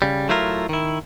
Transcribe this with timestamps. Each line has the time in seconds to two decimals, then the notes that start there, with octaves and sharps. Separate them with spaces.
0.02 C#3 G3
0.29 F#3 A3 E4 F4 A#4
0.69 D#3 E4